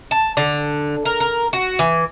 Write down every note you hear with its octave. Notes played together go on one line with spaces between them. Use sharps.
A5
D3
A#4
A#4
F#4
E3